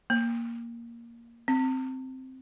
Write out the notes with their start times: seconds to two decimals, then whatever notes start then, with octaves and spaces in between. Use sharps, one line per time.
0.10 A#3
1.48 C4